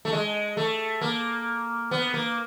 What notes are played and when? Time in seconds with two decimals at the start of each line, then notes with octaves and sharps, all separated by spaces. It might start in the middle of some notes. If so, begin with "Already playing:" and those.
0.05 A3
0.12 G#3
0.57 A3
1.01 A#3
1.91 B3
2.14 A#3